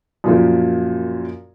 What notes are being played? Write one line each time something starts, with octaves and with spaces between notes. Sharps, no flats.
F#2 A#2 F3